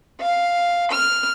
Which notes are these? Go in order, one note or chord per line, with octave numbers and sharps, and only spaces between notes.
F5
F6